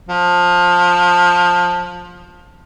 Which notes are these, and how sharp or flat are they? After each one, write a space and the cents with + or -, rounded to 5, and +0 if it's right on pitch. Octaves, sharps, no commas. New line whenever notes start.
F3 +20